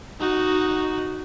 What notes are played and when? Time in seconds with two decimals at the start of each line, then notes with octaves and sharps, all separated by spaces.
0.19 D#4 F#4